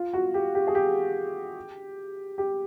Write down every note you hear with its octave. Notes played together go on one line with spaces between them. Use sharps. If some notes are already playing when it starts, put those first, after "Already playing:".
Already playing: F4
F#4
G4
G4
G#4
G4
G4